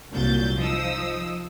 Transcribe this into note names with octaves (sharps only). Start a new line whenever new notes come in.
C2 A#2 F#3 G6 A6
F3 D#4 D#6 E6